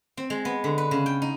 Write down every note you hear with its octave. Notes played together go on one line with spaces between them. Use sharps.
C4
G#3
B3
D3
B4
C#3
G5
D#4